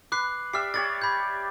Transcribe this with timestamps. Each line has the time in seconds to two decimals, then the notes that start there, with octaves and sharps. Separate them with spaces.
0.12 B4 D6 F#6 C7
0.53 G4 D5 E5 F6 C7
0.74 G4 C#5 D5 A6
1.02 B5 G6